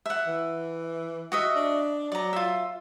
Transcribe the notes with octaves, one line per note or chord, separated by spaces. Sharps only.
E5 F#5
E3
F#4 D#5 E5
D4
F#3 D5 A#5
F4 E5